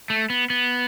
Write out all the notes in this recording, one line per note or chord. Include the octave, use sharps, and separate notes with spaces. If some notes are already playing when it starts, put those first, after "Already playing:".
A3
B3
B3